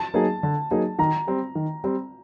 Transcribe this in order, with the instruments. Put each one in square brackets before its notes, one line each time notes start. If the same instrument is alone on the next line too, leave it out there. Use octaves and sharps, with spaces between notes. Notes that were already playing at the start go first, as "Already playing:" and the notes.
Already playing: [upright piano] A5
[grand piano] F#3 A#3 D#4 G#4
D3
F#3 A#3 D#4 G#4
[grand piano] D#3 [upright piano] A#5
[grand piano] G3 C4
D#3
G3 C4